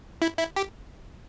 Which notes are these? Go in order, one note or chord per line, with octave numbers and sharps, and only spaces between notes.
E4
E4
G4